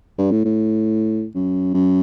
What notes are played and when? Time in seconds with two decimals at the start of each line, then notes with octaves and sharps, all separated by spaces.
0.18 G2
0.32 A2
0.45 A2
1.35 F#2
1.74 F#2